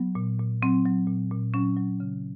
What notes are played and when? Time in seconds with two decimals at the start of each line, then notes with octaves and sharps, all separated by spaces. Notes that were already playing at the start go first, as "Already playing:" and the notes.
Already playing: F#3 B3
0.15 A#2
0.39 A#2
0.62 F#3 C4
0.86 F#3
1.07 A#2
1.31 A#2
1.54 F#3 C#4
1.77 F#3
2.00 C#3